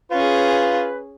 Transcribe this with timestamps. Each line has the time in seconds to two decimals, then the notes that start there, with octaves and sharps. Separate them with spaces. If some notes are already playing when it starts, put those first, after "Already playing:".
0.11 C#4 F4 G#4 B4